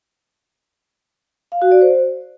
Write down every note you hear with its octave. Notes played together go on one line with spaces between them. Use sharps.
F5
F#4
D5
C5